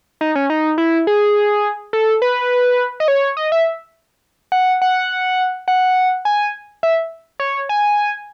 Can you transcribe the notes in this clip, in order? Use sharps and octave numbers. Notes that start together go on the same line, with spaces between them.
D#4
C#4
D#4
E4
G#4
A4
B4
D#5
C#5
D#5
E5
F#5
F#5
F#5
G#5
E5
C#5
G#5